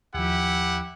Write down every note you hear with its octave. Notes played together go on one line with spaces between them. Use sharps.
D#2 F3 E4 G4 F#5